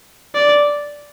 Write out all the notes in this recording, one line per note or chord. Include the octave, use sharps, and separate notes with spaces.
D5